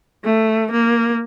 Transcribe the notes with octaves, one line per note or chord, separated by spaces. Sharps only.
A3
A#3